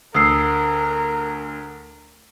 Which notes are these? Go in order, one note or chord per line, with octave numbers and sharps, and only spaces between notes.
D2 A#4 D#6 E6 C7